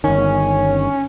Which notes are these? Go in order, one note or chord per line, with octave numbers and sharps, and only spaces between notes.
G1 D#3 C#4